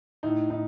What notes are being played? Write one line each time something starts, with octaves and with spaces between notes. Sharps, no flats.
A2 D#4
A2 D#4